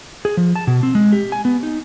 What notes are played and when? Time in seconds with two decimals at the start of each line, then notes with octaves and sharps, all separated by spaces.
0.25 G#4
0.37 F3
0.56 A5
0.67 B2
0.83 C4
0.95 G#3
1.12 G4
1.32 G#5
1.45 B3
1.63 D#4